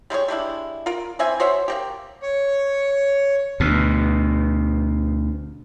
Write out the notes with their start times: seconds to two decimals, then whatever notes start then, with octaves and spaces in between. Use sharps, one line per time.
0.10 G3 G#3 E4 C#5
0.28 G3 G#3 D4 E4
0.86 F4 A#4
1.19 E3 C4 E5 G#5
1.40 F#4 C5 C#5 E5
1.68 A#3 C4 G4
2.22 C#5
3.60 D2 B2